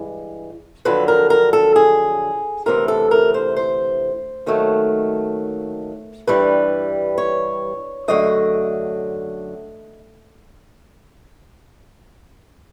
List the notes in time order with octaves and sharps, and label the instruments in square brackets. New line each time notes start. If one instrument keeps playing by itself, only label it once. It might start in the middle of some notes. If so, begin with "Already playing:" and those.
Already playing: [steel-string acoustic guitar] G2 E3 G#3
F2 D3 F#3 B4
A#4
A#4
A4
G#4
D2 C3 E3 A#4
A4
A#4
C5
C5
D#2 D#3 F#3 A3
G2 E3 G3 B4
C#5
F#2 D3 F#3 A3 D#5